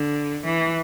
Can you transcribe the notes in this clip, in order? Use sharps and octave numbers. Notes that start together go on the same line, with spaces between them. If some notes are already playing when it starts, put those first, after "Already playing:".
Already playing: D3
E3